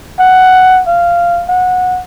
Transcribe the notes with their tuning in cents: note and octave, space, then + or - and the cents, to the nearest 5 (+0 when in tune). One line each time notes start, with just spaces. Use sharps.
F#5 +10
F5 -10
F#5 -20